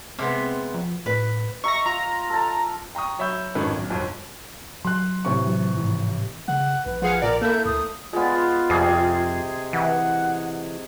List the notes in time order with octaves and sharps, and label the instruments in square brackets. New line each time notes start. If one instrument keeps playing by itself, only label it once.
[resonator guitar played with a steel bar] C3 G#3 B3 [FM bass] C4
[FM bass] F3
[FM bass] A2 [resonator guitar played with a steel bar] B4
[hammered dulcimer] E5 A#5 [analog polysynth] C#6 A#6
[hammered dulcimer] F4 [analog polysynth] A#5
[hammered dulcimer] A4 A5
[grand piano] G5 A#5 C#6 D#6
F#3 C#5 E5 B5 E6 G6
G#1 F2 D#3 C#4 A4 B4
B1
G1 F2
[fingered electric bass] F#3 [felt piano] C6 F#6
[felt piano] A1 C3 C#6
[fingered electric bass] E3 F#3
G#2 E3 F3
[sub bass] C#3 [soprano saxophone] F#5
[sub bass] A#1 [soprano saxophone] B4
[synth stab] F3 G#4 F5 [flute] F#5
[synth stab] A#2 D5 [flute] A#4
[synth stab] A#3 E4 [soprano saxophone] A4 [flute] G6
[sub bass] D2 [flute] D#6
[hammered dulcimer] G#3 B3 [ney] F4
[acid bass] F2 [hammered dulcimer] C3 G#4 D6
[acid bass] E3 [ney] F#5